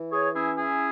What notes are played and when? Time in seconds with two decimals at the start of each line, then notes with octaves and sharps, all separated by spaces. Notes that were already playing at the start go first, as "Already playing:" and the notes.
Already playing: E3
0.12 G#4 C#5
0.35 C#4 E4 G#4
0.57 E4 G#4